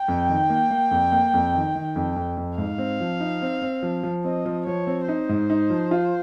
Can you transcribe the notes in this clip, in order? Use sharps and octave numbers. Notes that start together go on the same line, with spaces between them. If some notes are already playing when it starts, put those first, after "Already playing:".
Already playing: G5
F2
D#3
A#3
A#3
F2
A#3
F2
D#3
D#3
F2
F2
F2
G#2 F5
C4
F3
D#4
C4
C4
F3
F3
C4 D#5
F3
F3 C#5
C4
D#4 C5
G#2
D#4
F3
F4